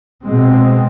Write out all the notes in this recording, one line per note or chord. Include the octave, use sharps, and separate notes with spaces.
B2 G#3 C4